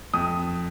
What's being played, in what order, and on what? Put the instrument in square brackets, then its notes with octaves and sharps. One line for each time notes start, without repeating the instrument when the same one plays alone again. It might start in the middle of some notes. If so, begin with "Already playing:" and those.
[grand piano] F2 D#6